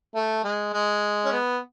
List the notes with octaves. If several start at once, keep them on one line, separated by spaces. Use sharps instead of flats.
A3
G#3
G#3
C#4
B3